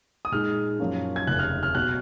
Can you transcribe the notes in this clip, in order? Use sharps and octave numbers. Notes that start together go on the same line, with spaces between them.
D#6
A#2 G#3 D#4 F6
F#2 F3 A#3 C#4
G#6
F1 D#2 C#3 F#6
F6
F6
B1 B2 F#3 F#6